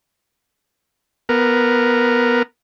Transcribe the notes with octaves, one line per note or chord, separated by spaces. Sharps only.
B3 A#4